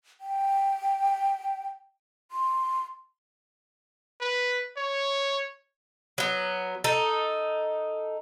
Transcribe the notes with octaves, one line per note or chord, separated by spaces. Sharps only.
G5
C6
B4
C#5
F#3 B3
D#4 A4